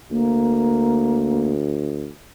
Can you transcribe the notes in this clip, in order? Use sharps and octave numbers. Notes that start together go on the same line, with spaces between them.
D2 A#3